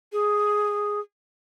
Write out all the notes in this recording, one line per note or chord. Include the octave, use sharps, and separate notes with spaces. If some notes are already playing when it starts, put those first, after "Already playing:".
G#4